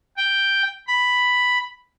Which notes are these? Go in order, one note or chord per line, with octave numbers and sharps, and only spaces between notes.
G5
B5